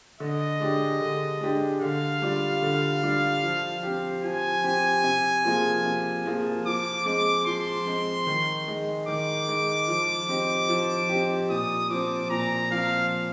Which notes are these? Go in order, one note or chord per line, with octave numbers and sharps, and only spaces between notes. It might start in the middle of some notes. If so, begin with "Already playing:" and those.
D3 D#5
G#3 D4 G4
D3
G#3 D4 G4
D3 F5
G3 D4 F4
D3
G3 D4 F4
F3
C4 G4
F3 G#5
C4 G4
C3
F3 A#3 F4 G#4
C3
F3 A#3 F4 G#4
F3 D6
G#3 C4 D6
F3 C6
G#3 C4
D#3
G#3 D#4
D#3 D6
G#3 D#4
F3
C4 D#4 G4
F3
C4 D#4 G4
A#2 D#6
F3 C4 D6
A#2 A#5
F3 C4 F5